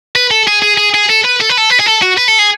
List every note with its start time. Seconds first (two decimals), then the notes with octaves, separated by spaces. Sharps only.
0.16 B4
0.31 A4
0.48 G#4
0.62 G#4
0.78 G#4
0.94 G#4
1.09 A4
1.24 B4
1.41 A4
1.50 B4
1.58 A4
1.70 B4
1.80 G#4
1.86 A4
2.02 F#4
2.17 B4
2.28 A4
2.39 G#4